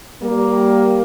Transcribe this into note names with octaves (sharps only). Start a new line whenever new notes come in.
G3 A#3